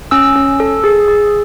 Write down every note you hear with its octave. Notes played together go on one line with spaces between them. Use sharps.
C#4 E6
C#4
A4
G#4
G#4